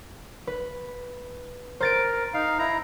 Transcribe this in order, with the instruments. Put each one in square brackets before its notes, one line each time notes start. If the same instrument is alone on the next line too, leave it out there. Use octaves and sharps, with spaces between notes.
[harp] B4
[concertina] A#4 [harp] C5 A6 D7
[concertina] D#4 F5
E4 A#5